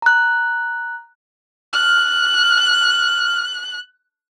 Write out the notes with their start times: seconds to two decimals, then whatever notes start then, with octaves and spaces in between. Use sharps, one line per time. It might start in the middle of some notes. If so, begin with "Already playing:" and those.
0.02 A#5 F#6
1.73 F6 F#6